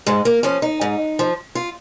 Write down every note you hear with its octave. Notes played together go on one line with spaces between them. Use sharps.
G#2 G#3
A#3
F3 C#4
D#4
G#2
F3
F4